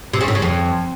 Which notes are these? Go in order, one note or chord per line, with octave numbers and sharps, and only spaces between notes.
C3
C#3
A2
C#3
F2